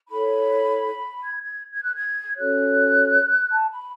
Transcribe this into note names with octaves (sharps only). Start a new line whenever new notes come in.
E4 A4 C#5 B5
G#6
G#6
G#6
F#6
G#6
C#4 F#4 A4 C#5 F#6
A5
B5